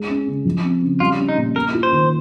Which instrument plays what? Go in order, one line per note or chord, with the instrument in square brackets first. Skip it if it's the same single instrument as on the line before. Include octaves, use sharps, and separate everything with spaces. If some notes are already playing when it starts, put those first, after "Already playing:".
Already playing: [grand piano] G#3
C#4
C#3
F3
C4
C#3
[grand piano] G3 [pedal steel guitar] F4
[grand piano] C#4
[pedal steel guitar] D#4
[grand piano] A#2
[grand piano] A#3 [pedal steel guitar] A#4
[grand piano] F4
[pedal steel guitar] C5
[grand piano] D#3